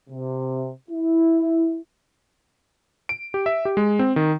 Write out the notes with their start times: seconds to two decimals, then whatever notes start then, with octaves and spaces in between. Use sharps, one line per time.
0.10 C3
0.90 E4
3.09 D7
3.34 G4
3.46 E5
3.65 G4
3.77 G#3
3.99 C4
4.16 D#3